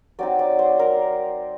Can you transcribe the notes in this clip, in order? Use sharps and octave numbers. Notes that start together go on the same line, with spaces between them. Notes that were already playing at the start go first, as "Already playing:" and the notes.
F#3 C4 D#4 D5
D5
C5
A#4